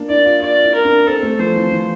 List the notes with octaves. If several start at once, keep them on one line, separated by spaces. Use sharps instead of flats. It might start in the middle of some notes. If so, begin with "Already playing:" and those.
Already playing: A#3 D4
E4 D5
F4
F4 D5
E4
A#4
D4
C4 A4
A3
F3 C5
E3
E3